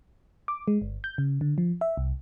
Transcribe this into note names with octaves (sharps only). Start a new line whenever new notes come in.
D6
G#3
G1
G6
C#3
D3
F3
E5
C2